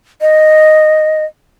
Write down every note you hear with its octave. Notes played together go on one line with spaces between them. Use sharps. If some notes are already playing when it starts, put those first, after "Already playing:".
D#5